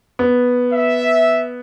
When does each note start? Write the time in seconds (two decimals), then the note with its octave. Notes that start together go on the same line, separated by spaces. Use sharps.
0.19 B3
0.73 E5